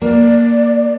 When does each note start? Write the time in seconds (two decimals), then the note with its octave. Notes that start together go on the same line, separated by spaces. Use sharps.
0.02 A#3 D5